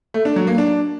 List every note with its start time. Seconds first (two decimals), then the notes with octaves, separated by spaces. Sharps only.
0.14 A3
0.25 D4
0.36 F#3
0.47 A#3
0.58 D4